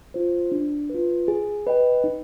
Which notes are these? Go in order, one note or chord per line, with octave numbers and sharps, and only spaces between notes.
F4 C5
D4
F4 B4
G#4
B4 D#5 G5
D#4